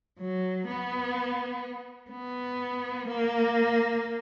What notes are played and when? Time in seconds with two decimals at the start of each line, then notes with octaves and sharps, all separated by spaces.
0.20 F#3
0.67 B3
2.11 B3
3.08 A#3